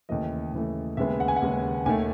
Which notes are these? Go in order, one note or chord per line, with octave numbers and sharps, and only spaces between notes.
D#2 C#3 E3 A3 D#5
D#2 C#3 E3 A3
D#2 C#3 G#3 B3 E5
F#5
G#5
F#5
D#2 C#3 G#3 B3
D#2 D#3 A3 G#5